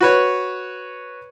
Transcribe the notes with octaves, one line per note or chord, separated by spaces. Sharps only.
F#4 B4 C#5